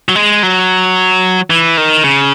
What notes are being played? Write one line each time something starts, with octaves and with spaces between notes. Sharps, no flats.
F#3
G#3
F#3
E3
D#3
C#3